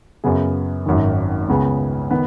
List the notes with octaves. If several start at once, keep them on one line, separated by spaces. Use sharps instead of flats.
F#2 C#3 B3 G#4
G#1 F#2 D#3
C#2 C#3 B3 G#4
D#3 B3